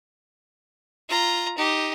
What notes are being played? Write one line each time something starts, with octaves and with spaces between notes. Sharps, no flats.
F4 A#5
D#4 G4